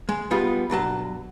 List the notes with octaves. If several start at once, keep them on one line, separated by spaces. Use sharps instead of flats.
G#3
G3 G#3 B3 F4
B1 G2 F#3 A5